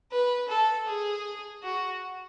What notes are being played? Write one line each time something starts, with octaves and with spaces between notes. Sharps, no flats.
B4
A4
G#4
F#4